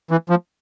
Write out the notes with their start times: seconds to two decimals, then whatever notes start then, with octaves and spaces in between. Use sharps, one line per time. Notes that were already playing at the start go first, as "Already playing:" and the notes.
0.11 E3
0.30 F3